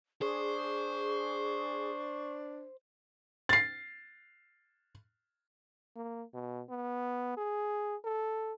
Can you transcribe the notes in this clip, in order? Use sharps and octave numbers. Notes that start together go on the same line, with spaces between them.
D4 G#4 C5 C#6
A6 C7
A#3
B2
B3
G#4
A4